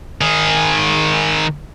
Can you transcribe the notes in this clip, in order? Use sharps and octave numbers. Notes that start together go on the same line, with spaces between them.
D#3 G#4